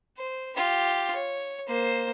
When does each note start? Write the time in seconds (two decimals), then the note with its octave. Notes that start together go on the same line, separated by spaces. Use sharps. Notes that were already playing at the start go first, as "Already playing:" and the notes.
0.17 C5
0.56 F4 G4
1.15 C#5
1.67 A#3 C5